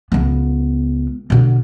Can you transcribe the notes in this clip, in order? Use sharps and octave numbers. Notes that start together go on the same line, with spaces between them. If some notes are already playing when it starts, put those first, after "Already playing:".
C#2 B3
B2 D3